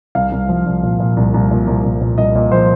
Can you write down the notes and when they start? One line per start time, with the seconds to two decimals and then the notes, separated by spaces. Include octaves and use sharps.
0.15 C2 F5
0.32 C2
0.49 F3
0.66 C2
0.83 A#2
1.00 A#2
1.17 C2
1.34 C2
1.51 A#2
1.67 C2
1.84 C2
2.01 A#2
2.18 C2 D#5
2.35 A#2
2.52 F3 C5